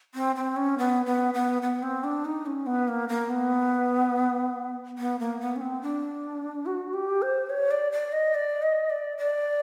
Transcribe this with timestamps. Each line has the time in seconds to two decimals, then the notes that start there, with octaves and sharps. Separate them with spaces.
0.15 C4
0.36 C4
0.56 C#4
0.78 B3
1.06 B3
1.34 B3
1.62 B3
1.83 C4
2.04 D4
2.25 D#4
2.46 C#4
2.67 B3
2.88 A#3
3.09 A#3
3.30 B3
4.98 B3
5.20 A#3
5.40 B3
5.56 C#4
5.61 C4
5.82 D4
6.66 F#4
6.94 G4
7.22 C5
7.50 C#5
7.71 D5
7.92 D5
8.13 D#5
8.34 D5
8.62 D#5
8.90 D5
9.18 D5